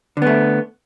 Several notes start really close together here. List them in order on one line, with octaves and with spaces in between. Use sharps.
D3 B3 A3